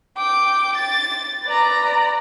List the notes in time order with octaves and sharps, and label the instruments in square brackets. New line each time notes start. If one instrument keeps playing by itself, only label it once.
[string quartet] G5 D6
A6
B4 D5 A#5